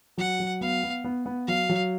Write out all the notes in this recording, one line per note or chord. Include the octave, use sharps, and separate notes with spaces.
F#3 F#5
F#3
B3 F5
B3
B3
B3
F#3 F5
F#3